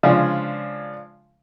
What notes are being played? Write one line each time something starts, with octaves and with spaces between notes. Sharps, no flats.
C#3 F3 G#3 D4